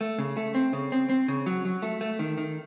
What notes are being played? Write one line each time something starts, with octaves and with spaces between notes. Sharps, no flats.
A3
C#3
A3
C4
C#3
C4
C4
C#3
F#3
F#3
A3
A3
D#3
D#3